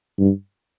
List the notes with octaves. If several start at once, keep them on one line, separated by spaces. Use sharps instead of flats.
G2